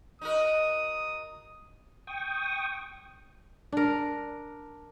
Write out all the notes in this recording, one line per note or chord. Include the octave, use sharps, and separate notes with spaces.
D#4 F#4 A#4 D#6
G5 C#6 D#6
D4 A#4